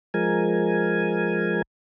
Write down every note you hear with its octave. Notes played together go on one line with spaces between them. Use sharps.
F3 G#3 A#4 G#5